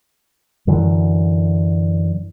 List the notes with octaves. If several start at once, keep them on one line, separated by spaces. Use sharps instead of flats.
F#2 D3 E3 F#3